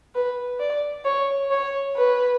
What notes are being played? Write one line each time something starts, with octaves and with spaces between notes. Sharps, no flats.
B4
D5
C#5
C#5
B4